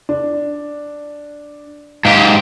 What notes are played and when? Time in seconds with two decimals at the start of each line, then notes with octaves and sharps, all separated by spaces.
0.09 D4
2.05 G#2 G4 F5 A#5